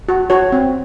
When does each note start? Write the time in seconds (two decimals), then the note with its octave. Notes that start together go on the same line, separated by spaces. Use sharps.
0.09 F#4
0.30 F#4 C#5
0.52 C4